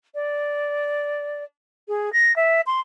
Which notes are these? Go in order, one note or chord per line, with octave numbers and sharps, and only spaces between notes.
D5
G#4
A#6
E5
C6